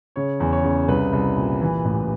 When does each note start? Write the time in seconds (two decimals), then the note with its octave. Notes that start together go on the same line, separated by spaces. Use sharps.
0.16 C#3 C#5
0.40 E2
0.52 C#5
0.64 C#3
0.88 C2 B4
1.13 C2
1.36 A#2
1.61 E3
1.85 A1